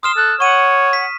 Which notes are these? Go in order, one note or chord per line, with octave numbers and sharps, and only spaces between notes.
C6 D#6 F6 E7
A4 F#6
C#5 F#5 C#6 D#7
B6